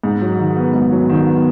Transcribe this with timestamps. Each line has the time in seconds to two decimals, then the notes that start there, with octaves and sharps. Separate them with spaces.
0.04 G#2
0.22 F#3
0.39 D#3
0.57 B3
0.74 G#2
0.92 F#3
1.09 D#3
1.27 B3